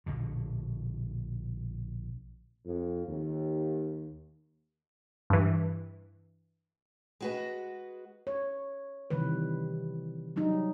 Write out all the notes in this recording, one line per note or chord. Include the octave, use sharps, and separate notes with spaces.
A#1 B2 D3
F2
D#2
G2 E3
G#3 F#4 B4
C#5
C3 D#3 E3 G3 B4
F#3 G3 D#4